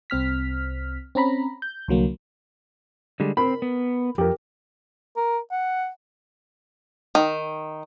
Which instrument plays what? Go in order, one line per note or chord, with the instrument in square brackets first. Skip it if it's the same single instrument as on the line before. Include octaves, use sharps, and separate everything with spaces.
[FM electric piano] C2 C4 F6 B6
C4 C#4 A#5 B5
G6
C2 D3 F#3 A#3
[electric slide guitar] D3 G3 G#3
[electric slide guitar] C4 [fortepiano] A#4 B5
[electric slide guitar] B3
[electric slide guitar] F2 [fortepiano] G4 A#4
[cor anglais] A#4
F#5
[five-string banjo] D#3